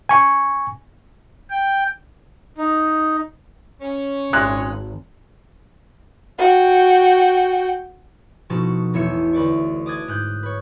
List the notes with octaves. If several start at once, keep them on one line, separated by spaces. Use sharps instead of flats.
G#5 C#6
G5
D#4
C#4
G#1 A#2 G#3 F#6
F#4 G5
B2 F3 D#4 F#4 A4
A1 E2 C#5 E5 E6 C#7
D2 B4 D5 C#6
D6 D#6 F#6 G#6 A6
G#2 F#6 G6
B4 C#5